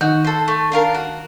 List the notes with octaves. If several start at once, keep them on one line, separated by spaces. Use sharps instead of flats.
D#3 D#4 F#4
A4 C5
A3
D4 F4 A#4
F#4